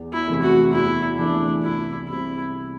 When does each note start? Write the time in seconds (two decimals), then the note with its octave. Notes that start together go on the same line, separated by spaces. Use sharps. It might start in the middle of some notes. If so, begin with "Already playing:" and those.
Already playing: E2
0.13 E4
0.28 C3 E3 A3
0.43 F#4
0.73 E2 E4
1.18 C3 E3 A3 D4 E4
1.63 C2 E4
2.09 C3 G3 C4 E4